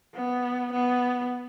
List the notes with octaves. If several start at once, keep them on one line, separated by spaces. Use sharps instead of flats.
B3
B3